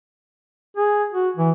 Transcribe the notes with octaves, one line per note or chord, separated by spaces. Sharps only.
G#4
F#4
E3